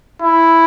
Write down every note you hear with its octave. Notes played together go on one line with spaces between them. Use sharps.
E4